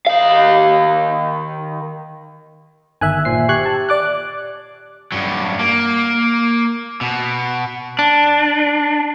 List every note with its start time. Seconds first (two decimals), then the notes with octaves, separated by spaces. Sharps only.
0.07 D#3 F5
3.01 G1 D#3 E5 G#5 F#6
3.25 A#2 C5 C7
3.49 G4 C#6 F#6 G#6
3.66 A5
3.89 D5 D6 F#6
5.12 G2 F#3
5.59 A#3
7.01 B2
7.99 D4